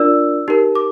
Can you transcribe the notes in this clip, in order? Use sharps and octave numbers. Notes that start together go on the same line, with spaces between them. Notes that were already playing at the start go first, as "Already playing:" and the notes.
Already playing: D4 F4 A#4 D5 E6
D#4 G4 A#4
D6